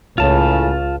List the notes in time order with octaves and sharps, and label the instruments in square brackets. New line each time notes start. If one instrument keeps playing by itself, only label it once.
[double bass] C#2 [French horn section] A2 C#3 [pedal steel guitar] F4 A5